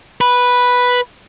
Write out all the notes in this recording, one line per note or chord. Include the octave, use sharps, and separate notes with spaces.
B4